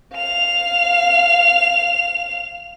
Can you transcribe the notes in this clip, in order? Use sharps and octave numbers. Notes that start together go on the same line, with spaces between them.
F5 F7